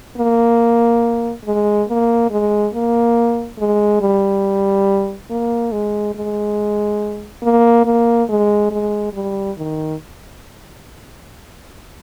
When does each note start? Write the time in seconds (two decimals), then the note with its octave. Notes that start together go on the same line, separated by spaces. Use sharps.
0.17 A#3
1.45 G#3
1.89 A#3
2.31 G#3
2.74 A#3
3.58 G#3
4.01 G3
5.30 A#3
5.72 G#3
6.15 G#3
7.42 A#3
7.85 A#3
8.29 G#3
8.71 G#3
9.13 G3
9.57 D#3